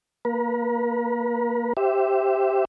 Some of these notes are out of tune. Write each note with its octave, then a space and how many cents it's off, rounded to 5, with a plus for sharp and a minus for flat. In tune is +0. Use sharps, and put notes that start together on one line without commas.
A#3 +0 B4 -45
G4 -5 C5 +0 E5 +10